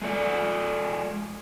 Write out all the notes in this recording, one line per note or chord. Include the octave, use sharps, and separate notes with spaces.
G#3 A4 D5